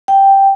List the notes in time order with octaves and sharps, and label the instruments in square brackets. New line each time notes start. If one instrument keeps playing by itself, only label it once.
[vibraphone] G5